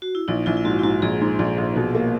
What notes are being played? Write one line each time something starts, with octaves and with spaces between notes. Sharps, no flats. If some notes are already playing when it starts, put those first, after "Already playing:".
F#4
E4
A#1 D#4
A#1 E4
E4
G#2 F#4
E4
G#2 F#4
A#1 G#4
G#2
A#1
A#1
B2
A#3